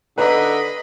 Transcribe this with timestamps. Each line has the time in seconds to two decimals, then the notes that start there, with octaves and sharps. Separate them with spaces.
0.18 D3 B4 D#5 A#5 B5